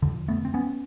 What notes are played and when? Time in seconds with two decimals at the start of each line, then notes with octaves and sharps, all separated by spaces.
0.02 F2 D3
0.28 A3 B3
0.45 C4
0.54 B3 C#4